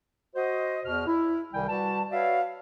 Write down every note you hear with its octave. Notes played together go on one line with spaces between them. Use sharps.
F#4 C5 D#5
E2 B2 F6
E4
C2 C3 D#3 G3 G5 G#5
G3 F#4 B4 A5
F#4 B4 C#5 D5 E5 F5